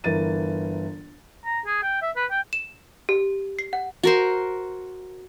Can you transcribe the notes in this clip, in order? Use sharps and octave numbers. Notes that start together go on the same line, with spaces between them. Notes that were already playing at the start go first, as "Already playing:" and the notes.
G1 E3 A#4 A6 D#7
A#5
G#4
G5
E5
B4
G5
E7
G4
C7
F#5
F#4 A#4 C5